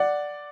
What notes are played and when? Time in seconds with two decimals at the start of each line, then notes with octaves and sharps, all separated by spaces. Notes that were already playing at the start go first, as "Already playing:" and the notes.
Already playing: D5 F#5